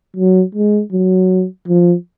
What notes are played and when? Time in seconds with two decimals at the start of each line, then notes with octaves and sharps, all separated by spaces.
0.17 F#3
0.55 G#3
0.92 F#3
1.68 F3